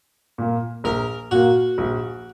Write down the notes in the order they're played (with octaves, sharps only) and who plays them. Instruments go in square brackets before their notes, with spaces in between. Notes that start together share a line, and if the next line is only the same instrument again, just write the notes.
[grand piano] A#2 A#3
[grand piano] A#1 [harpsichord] A#4
[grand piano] A#2 A#3 [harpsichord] F#4
[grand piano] A#1